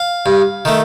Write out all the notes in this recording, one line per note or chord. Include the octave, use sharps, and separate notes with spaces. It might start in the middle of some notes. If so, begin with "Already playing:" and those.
Already playing: F5
G2
D#3 A3